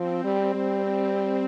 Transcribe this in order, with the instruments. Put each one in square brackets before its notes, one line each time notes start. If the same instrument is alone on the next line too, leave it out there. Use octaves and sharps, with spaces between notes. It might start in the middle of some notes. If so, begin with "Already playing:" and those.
Already playing: [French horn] F3 [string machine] C4
[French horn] G3
G3